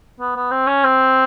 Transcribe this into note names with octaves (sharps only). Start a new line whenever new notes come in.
B3
B3
C4
C#4
C4